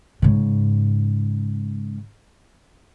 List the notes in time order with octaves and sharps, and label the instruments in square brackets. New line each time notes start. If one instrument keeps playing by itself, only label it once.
[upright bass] G#2 C#3